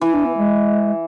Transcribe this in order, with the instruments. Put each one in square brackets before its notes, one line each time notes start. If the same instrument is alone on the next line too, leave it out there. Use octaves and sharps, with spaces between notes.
[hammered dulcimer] E3 [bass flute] E4
[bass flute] D4
B3
G#3